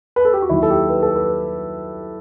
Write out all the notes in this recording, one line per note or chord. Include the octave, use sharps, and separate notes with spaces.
B4
A4
G4
F#4
D#2 D#3 F#3 E4
A4
G4
B4
A4
B4